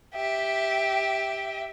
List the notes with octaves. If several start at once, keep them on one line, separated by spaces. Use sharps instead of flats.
G4 E5